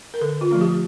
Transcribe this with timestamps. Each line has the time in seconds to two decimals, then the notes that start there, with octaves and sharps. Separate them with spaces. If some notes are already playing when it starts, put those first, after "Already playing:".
0.14 A#4
0.21 D3 A4
0.41 F4
0.51 F3 A3 C#4
0.61 G4